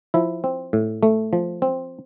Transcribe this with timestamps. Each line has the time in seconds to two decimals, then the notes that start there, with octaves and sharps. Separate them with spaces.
0.14 F3 E4
0.44 C4
0.73 A2
1.03 A3
1.33 F3
1.62 C4